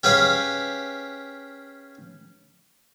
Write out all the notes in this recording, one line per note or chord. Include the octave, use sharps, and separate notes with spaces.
C#4 G4 G#4 B4 F5 G#5